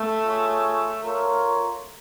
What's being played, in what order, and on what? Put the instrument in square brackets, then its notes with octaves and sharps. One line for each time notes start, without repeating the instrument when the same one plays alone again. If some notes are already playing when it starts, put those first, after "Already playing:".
Already playing: [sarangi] A3
[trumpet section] F4 G#4 C#5
F4 A#4 C#5